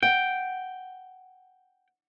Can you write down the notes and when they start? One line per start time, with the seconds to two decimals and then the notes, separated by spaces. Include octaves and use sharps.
0.03 F#5 G5